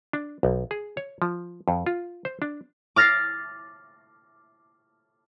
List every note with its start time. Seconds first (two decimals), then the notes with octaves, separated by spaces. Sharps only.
0.13 D4
0.43 B1
0.71 G#4
0.97 C#5
1.22 F3
1.68 F2
1.86 F4
2.25 C5
2.42 D4
2.96 D6 F6 A6 A#6 C7